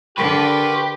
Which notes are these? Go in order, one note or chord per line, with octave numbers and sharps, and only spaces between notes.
D3 G4 A#4 B4 C6 C#6